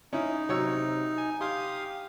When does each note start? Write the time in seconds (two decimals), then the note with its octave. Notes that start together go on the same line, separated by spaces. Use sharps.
0.13 C#4 D#4 E4
0.49 C3 F#3 C#5 E6
1.18 G#5
1.41 G4 F5 C6 D#6